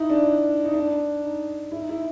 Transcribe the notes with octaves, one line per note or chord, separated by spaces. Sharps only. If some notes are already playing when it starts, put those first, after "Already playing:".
Already playing: D#4 E4
D4
D#4
D4
D#4
E4
D#4
E4